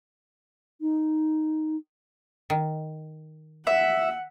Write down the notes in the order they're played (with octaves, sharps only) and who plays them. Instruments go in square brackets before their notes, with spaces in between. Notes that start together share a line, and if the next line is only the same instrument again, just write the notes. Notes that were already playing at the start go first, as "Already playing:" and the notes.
[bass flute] D#4
[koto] D#3
[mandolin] E5 [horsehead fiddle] F#5